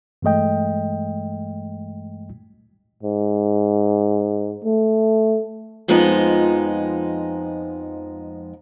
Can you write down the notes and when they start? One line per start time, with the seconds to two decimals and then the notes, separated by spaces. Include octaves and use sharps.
0.22 G2 E3 G#3 A3 D#5 G5
3.03 G#2
4.64 A3
5.88 F2 F3 G#3 B3 D#4